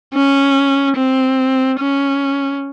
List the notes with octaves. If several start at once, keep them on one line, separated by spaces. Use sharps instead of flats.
C#4
C4
C#4